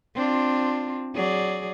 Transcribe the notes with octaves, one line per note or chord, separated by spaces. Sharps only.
C4 D4 F4
F#3 G#4 D5